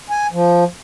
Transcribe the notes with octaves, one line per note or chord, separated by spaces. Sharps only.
G#5
F3